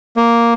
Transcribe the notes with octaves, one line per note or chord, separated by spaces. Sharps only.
A#3